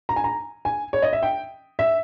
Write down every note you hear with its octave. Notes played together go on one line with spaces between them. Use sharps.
A#5
G#5
A#5
G#5
C#5
D#5
E5
G5
E5